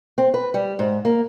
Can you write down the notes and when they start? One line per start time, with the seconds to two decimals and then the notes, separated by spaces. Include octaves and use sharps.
0.18 C4
0.34 B4
0.54 G3
0.79 G#2
1.05 A#3